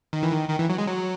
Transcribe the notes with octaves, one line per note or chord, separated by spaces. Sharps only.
D#3
E3
D#3
D#3
E3
F#3
G#3
F#3